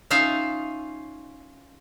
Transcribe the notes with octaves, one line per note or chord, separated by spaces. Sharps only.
C#4 D#4 F4 E5 F5